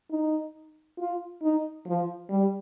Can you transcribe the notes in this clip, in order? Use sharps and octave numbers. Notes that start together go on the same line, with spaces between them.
D#4
F4
D#4
F3
G3